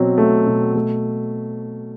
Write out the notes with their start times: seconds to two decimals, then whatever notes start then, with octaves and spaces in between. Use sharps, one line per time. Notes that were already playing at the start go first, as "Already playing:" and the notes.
Already playing: B2 F#3 C4
0.18 A3
0.47 B2
0.75 A3